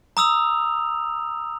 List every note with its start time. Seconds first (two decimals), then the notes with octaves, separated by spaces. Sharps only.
0.17 A#5 D#6 E6 F7